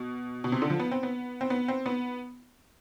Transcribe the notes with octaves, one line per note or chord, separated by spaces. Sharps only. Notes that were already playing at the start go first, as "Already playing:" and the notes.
Already playing: B2
B2
C3
D3
F3
B3
C4
B3
C4
B3
C4
B3